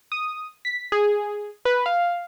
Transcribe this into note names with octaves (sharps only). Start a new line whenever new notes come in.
D#6
B6
G#4
B4
F5